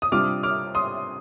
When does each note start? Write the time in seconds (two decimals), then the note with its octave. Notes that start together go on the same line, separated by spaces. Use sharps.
0.02 D#6
0.12 C3 G3 D4 F4 D6 F6
0.43 D6 F6
0.75 C6 D#6